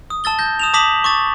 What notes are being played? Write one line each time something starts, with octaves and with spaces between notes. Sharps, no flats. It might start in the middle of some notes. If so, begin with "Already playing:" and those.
D#6
A5 E6 A6 G7
G6 A#6
D#6 E7 F7
A5 D6 D#6 A#6 B6 F#7
C#6 D6 A6